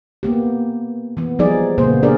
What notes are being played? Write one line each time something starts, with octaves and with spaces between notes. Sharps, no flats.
A#3 B3 G4
E3 B3
F3 G3 B3 D#4 G#4 D5
A#2 C#3 A#3 B3 C5
D4 G4 G#4 A#4 D5